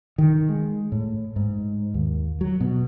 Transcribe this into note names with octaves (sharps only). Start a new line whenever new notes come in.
D#3
G#3
A2
G#2
D#2
F#3
B2